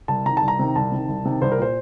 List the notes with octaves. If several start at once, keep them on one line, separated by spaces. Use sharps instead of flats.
C2 A5
C3 D#3 A#5
C2 A5
A#5
C3 D#3
C2 A5
C3 D#3
C2
C3 D#3
C2 C5
A#4
A#2 C5